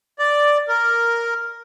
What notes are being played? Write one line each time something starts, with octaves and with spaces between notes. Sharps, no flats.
D5
A#4